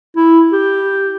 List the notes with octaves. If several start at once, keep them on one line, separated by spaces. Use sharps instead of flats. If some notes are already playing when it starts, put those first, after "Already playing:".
E4
G4